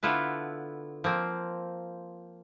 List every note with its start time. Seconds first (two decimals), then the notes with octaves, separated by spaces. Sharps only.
0.03 D3 B3 E4 F4 A4 B4
1.04 F3 A#3 C4